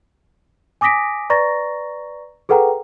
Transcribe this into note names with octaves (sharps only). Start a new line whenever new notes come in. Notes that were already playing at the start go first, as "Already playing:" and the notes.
G#5 D6 D#6 A#6 B6 D7
B4 D5 A#5 C#6 A6 A#6
G#4 A4 B4 F#5 G5 A#5